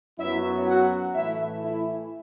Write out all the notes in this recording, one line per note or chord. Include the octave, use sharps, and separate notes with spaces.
F#2 F#3 B3 E4 E5
F#4 F#5
A2 E3 A3 E4 E5
E4 E5